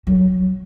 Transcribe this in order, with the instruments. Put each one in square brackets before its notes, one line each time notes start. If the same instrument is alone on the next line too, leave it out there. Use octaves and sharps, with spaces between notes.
[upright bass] F#3